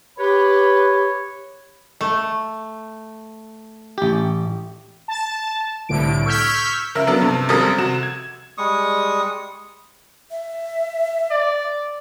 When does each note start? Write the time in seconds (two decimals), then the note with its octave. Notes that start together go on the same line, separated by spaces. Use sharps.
0.19 G4 B4 C#5 B5
2.01 A3
3.98 A1 G4
5.08 A5
5.89 C2 A2 D3 D7
6.26 C#6 E6 F6 G6 G#6 B6
6.95 C#2 A#4 E5 E6
7.07 F#3 B3 D4 A4
7.21 G2 C3
7.49 G#1 F#2 G3 A4 A#4 D#6
7.78 C3 F#4 E7
8.03 G#6
8.58 G3 G#3 C#6 D#6
10.31 E5
11.31 D5